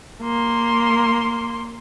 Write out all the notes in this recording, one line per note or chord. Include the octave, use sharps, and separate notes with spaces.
A#3 C6